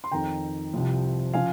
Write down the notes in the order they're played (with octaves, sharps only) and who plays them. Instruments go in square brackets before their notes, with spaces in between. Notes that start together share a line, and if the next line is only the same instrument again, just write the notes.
[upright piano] C6
F2 D#3 G5 A#5
C2 C3 F3
C#3 F3 F5 G#5